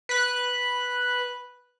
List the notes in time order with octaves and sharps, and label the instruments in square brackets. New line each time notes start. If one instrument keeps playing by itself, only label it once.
[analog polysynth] B4 F#6